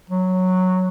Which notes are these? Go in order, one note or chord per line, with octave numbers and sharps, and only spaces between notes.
F#3